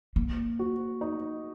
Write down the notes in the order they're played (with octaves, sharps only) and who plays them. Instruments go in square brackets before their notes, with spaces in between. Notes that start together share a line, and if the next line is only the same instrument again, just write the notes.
[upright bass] A#3
[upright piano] F#4
D#4